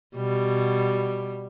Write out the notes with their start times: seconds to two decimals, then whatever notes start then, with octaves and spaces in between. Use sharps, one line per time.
0.16 B2 G3